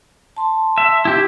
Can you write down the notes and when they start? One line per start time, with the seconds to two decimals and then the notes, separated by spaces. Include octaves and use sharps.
0.37 A5 C6
0.78 E5
1.05 E4 G4